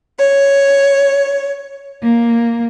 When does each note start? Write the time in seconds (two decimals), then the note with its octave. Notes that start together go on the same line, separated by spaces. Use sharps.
0.19 C#5
2.02 A#3